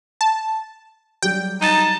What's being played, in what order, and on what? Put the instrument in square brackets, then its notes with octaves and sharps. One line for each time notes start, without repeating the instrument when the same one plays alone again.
[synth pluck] A5
[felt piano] F#3 G3 G4 [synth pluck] G5
[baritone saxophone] D#4 [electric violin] A5